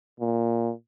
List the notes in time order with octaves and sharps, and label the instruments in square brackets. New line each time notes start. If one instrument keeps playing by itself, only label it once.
[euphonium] A#2